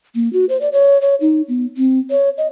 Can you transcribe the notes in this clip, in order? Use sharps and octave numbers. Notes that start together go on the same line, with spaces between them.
A#3
F#4
C5
D5
C#5
C#5
D#4
B3
C4
C#5
D#5